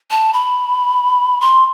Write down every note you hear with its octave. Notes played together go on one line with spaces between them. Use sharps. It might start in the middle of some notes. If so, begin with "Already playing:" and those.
A5
B5
C6